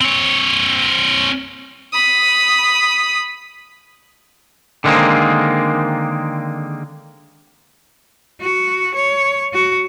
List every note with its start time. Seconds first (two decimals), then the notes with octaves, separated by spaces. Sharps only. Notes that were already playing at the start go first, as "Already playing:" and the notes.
0.01 C4 C#5
1.93 B5 D#6
4.84 D3 D#3 G#3 A#3 C4
8.41 F#4
8.95 C#5
9.54 F#4